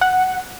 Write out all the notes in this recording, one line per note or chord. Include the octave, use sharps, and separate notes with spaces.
F#5